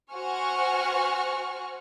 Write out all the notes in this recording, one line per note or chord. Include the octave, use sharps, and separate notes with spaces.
F#4 C5 F#5 G#5 C#6 F6